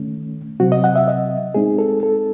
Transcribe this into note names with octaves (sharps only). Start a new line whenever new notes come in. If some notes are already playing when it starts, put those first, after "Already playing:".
Already playing: D#3 A3 C#4
C3 F#3 C4 F#4
D#5
F#5
E5
D#5
A2 G#3 C4 D#4 G#4
A4
A4